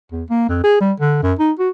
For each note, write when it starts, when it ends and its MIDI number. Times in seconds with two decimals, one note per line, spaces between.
0.12 0.23 40
0.30 0.45 58
0.49 0.60 41
0.63 0.78 68
0.81 0.93 55
1.00 1.22 50
1.23 1.33 42
1.39 1.52 63
1.59 1.69 66